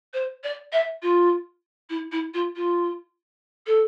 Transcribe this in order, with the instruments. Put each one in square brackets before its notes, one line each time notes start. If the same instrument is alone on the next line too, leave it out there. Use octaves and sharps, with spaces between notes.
[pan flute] C5
D5
E5
F4
E4
E4
F4
F4
A4